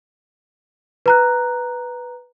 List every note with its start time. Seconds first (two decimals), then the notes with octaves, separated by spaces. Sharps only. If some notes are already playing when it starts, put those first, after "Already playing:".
1.06 B4 A#5 F#6